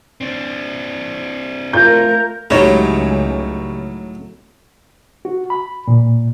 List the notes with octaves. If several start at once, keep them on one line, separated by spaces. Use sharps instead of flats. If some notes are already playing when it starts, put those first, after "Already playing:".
C4 D4
A3 F4 A#4 G6
C#2 A2 F#3 G3 D#4 C#5 C6
F#4
B5
A#2